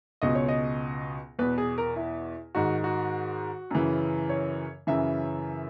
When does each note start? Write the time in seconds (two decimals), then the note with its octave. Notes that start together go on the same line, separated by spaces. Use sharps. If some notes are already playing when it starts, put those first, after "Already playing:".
0.22 C#2 B2 D#5
0.35 C#5
0.48 D#5
1.39 E2 B2 B4
1.58 G#4
1.78 A#4
1.96 E4
2.55 G#2 D#3 F#4
2.84 F#4
3.71 F#2 C#3 E3
4.29 C#5
4.87 F#2 C#3 E3 E5